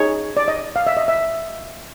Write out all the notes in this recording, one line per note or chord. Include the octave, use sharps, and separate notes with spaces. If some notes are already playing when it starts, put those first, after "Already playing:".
Already playing: D#4 G#4 C#5
D5
D#5
F5
E5
D#5
E5